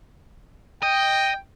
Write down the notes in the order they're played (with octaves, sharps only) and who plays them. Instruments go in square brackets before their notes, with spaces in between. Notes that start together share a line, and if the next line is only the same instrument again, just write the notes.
[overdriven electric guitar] D#5 [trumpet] G5